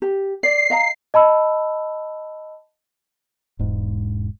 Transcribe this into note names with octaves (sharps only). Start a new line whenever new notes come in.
G4
D5 C7
D#5 F5 A#5
D#5 A5 B5 E6
E1 G#2